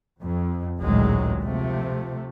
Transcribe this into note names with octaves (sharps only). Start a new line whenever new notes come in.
F2
A1 D2 A#2 D#3 F#3 G#3
C3 F3 A3